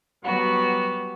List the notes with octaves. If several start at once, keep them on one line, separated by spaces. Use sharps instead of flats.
F#3 G3 B3 F#4